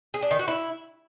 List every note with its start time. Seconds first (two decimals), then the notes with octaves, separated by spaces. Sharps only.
0.14 G#4
0.22 D4
0.31 D#3
0.39 F#4
0.48 E4